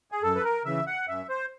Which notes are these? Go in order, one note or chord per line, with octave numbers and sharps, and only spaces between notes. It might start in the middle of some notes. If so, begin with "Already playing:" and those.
G#4
F#2 A4
B4
A#4
C#3 E3 E5
F#5
F#2 E5
C5